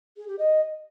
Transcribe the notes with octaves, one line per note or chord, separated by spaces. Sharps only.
G#4
G4
D#5